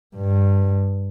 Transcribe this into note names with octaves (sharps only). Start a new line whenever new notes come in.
G2